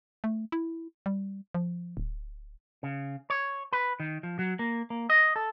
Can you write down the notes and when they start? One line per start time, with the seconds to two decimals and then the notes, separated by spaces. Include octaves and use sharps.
0.24 A3
0.52 E4
1.06 G3
1.54 F3
1.97 D1
2.83 C#3
3.30 C#5
3.73 B4
4.00 D#3
4.23 F3
4.39 F#3
4.59 A#3
4.90 A#3
5.10 D#5
5.36 A4